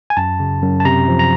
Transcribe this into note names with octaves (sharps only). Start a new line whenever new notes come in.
G#5
F#2 A5
C#3
F#2
A5
C3 A#5
F3
A#5